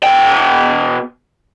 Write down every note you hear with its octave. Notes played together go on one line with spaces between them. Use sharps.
B2 G5